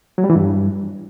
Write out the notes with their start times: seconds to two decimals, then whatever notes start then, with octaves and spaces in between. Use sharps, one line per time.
0.18 F#3
0.24 G3
0.30 E3
0.36 G2